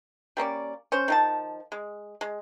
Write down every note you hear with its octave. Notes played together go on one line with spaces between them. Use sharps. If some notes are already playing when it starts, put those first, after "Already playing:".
G3 A#3 C#4 D5
C#4 C5
D#3 F3 A5
G#3
G#3